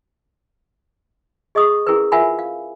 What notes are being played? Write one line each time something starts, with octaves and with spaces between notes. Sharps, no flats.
G#4 D#5 C#6 D#6
C#4 E4 G#4 A#4 B4
F4 A#4 E5 F#5 G#5 B5
F5